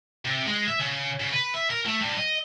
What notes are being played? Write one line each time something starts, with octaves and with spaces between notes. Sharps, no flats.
C3
G#3
E5
C#3
C#3
B4
E5
A#4
A3
G2
D#5